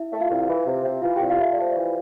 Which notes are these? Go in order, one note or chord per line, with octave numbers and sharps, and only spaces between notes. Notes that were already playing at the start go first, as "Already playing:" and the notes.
Already playing: E4 E5
A3
F4 F5
C2
E3
C3
C3
E3 F4 F5
C2 G4 G5
F4 F5
A3 E5
D5
A3 C5
E3 D5